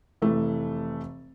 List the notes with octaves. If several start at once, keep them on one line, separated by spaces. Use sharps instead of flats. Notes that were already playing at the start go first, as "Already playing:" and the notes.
F1 E3 A3